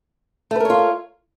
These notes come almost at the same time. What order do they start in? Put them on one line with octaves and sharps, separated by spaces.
A3 B4 A#4 C#5 F4